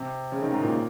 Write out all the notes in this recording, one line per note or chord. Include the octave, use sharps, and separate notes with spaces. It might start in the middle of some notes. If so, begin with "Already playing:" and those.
Already playing: C3
C#3
D#3
G#2
A#2